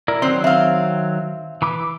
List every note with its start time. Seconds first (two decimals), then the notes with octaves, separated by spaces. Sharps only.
0.08 E4 A#4 D5
0.22 D#3 F#3 C4 C6
0.44 C4 E5 F5
1.62 E3 B5 D6